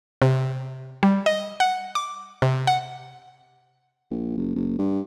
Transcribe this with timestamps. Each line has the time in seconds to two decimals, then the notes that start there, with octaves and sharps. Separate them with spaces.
0.22 C3
1.03 G3
1.26 D#5
1.60 F#5
1.95 D6
2.42 C3
2.67 F#5
4.11 A#1
4.37 F#1
4.55 F#1
4.78 G2